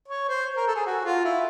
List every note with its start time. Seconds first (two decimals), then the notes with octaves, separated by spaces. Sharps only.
0.08 C#5
0.28 C5
0.57 A#4
0.67 A4
0.76 G#4
0.86 F#4
1.05 F4
1.25 E4